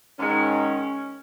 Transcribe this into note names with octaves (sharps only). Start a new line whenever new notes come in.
G#2 D#3 G#3 C#4